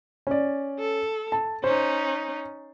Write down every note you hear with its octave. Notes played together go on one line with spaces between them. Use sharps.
C#4 D5
A4
A5
C#4 D#4 C5